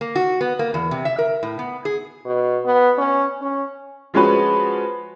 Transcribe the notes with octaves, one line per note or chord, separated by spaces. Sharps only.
A#3
F#4
B3
A#3
E2
C3
E5
A#4
A2
B3
G#4
B2
B3
C#4
C#4
F3 G#3 C#4 F#4 B4